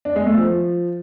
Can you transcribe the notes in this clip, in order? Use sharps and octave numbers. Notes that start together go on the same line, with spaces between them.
D4
G#3
A3
F3